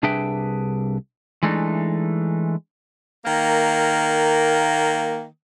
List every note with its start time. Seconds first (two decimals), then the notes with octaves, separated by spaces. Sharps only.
0.03 C2 D4 G#4 B4 E5 G5
1.43 E3 G#3 A3 D4 D#4
3.25 D#3 A#3